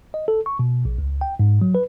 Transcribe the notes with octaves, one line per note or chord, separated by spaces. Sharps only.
D#5
A4
C#6
B2
A#1
C#2
G5
G#2
F#3
B4